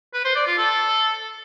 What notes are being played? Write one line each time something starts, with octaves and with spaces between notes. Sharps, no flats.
B4
C5
D5
F4
A4